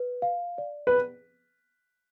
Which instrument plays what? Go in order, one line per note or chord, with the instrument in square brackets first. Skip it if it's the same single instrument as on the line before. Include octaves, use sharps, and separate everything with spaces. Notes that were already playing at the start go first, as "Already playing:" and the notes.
Already playing: [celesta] B4
F5
D5
[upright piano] B4